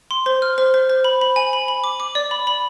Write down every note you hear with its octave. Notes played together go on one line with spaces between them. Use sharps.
C6
C5
F6
C5
C5
C5
B5
B5
G#5
B5
B5
D6
D6
D5
B5
B5